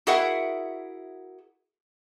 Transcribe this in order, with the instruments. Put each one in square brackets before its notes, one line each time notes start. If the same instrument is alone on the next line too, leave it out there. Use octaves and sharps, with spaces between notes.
[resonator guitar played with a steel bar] E4 F#4 G#4 A#4 E5 F#5